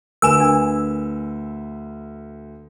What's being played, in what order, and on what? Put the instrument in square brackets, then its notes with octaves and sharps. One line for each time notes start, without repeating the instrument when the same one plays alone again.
[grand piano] D2 B4 E7 [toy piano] A#4 G#5 [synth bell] E6
[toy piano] D4